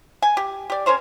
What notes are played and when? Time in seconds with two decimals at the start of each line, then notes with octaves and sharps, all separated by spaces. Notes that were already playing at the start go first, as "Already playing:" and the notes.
0.22 G#5
0.37 G4
0.70 G4 D5
0.86 C#4 A#4 C5 C#5